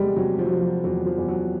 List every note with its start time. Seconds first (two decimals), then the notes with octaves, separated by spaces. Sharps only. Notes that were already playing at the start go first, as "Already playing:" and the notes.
Already playing: F1 E2 C3 G3 G#3
0.16 C3 F#3
0.39 F3
0.46 F#3
0.50 C3 F3
0.61 F#3
0.84 E2 F#3
1.06 F3
1.17 E2
1.28 F#3